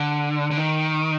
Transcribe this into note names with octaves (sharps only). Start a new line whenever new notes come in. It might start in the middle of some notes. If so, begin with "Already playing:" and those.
Already playing: D3
D3
D#3